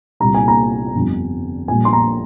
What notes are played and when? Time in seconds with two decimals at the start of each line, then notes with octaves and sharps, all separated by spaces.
0.20 C2 A#2 G3 A#5
0.34 G#5
0.48 A#5
0.94 G1 F2 D3 G3
1.68 A#1 A#2 G3 G#5
1.85 C6
1.93 A#5